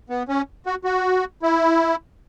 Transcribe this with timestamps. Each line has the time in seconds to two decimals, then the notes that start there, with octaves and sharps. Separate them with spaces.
0.10 B3
0.28 C#4
0.66 F#4
0.84 F#4
1.42 E4